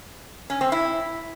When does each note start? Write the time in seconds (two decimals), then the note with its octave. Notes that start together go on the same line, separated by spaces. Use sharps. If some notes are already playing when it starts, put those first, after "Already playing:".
0.50 C#4
0.61 C4
0.72 E4